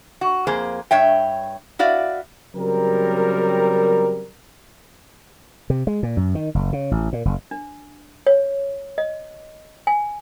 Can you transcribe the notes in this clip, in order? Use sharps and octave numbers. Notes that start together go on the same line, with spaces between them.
F#4
F2 A#3 G#4 C5
G2 C#5 E5 G5
E4 F#4 D5 F5
C#3 F#3 G3 C4 A#4
C3
G#3
A#2
F#2
D#3
F#1
C#3
A1
A#2
F#1
D4
C#5
D#5
G#5